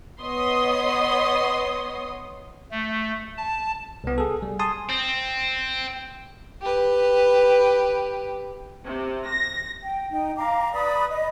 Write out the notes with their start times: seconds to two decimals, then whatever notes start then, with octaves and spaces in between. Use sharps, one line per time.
0.22 B3 C#5 D#5 C6 D#6
2.71 A3
3.37 A5
4.04 C2 B3
4.18 G#4 A4
4.42 G3
4.59 G#5 A5 C6 D#6
4.89 C4
6.62 G4 B4
8.85 C3
9.27 A#6
9.82 G5
10.11 D#4 G5
10.36 F5 A#5 D6
10.72 B4 D5 B5 D#6
11.10 D#5